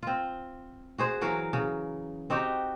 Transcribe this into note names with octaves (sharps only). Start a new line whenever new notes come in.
C4 F4
F#4 G#4 C5
E3 F#3 A#4 F5
C#3
C4 D#4 F#4 G4